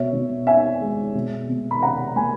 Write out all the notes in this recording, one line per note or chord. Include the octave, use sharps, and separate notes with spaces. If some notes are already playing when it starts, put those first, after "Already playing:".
Already playing: B2 C#5 E5
B2
C#4 E5 G#5
G#3
B2
B2
B5
C#4 F#5 A#5
A#3 G#5 B5